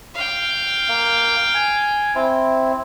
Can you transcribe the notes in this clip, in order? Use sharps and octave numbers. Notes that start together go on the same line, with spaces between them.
F5 G5
A#3
G#5
C4 E4